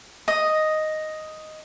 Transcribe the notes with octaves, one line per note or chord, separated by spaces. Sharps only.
D#5